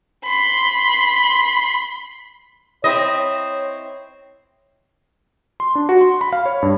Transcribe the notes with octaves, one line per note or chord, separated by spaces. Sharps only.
B5 C6
C4 E4 C#5 D#5
C6
D4
F#4
C6
B5
F5
C#5
G2